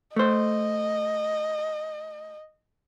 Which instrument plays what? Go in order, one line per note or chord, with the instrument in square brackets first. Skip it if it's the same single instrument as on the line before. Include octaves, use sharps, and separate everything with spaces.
[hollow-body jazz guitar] A3 C5 [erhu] D#5